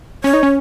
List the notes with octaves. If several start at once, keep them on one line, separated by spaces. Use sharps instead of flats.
C#4 C#5
D#4
C#4